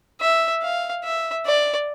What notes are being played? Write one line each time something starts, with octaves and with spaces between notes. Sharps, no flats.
E5
F5
E5
D5